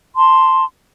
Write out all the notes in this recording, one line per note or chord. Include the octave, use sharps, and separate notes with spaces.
A5 C6